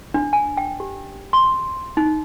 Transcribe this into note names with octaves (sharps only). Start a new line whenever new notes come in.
D4
G#5
G5
G4
C6
D#4